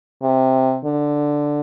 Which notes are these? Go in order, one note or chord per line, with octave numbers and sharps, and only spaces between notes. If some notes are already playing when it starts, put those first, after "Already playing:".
C3
D3